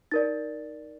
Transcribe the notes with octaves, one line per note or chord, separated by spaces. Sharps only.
D#4 A#4 D5 A6